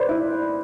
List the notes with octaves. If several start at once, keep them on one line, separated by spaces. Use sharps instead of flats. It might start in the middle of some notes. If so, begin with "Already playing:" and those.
Already playing: B4 C5 D5
E4